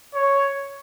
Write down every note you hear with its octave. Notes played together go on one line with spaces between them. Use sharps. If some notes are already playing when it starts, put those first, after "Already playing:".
C#5